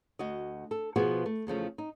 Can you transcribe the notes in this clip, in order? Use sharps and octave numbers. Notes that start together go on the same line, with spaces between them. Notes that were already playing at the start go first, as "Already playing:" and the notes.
D2 F#4 D#5
A4
B2 F3 B3 F#4 G#4
A3
E2 C#3 F3 A3
D#4